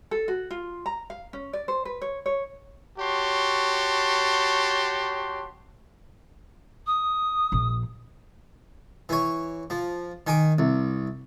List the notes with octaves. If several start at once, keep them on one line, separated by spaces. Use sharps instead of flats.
A4
F#4
F4
A#5
F5
C#4
D5
C5
B4
C#5
C#5
F#4 G4 C#5 A5 C6
D#6
A#1
E3 C#5
F3
D#3 G#5 D6
C2